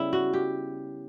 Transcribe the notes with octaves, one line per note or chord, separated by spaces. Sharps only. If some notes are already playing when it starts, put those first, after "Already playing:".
Already playing: C#3 G3 B3 E4
F#4
G4